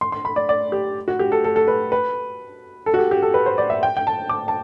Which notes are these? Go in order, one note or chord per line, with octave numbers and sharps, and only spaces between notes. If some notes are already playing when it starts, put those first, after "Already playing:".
C6
C6
B5
D5
D5
G4
F#4
G4
A4
A4
A4
B4
B4
A4
F#4
G4
G4
A4
B4
C5
D5
E5
G5
G5
A5
D6
A5